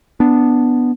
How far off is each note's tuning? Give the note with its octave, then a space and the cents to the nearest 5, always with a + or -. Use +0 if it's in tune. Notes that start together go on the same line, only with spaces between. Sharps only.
B3 +0 D4 +0